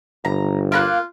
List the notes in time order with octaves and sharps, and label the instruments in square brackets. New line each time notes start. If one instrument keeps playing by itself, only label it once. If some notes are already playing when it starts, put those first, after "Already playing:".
[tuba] G1 [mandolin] A#5
[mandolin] A#3 A#5 F#6 [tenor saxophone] F4